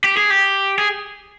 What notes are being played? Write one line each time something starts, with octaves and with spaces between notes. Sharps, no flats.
G4
G#4
G4
G#4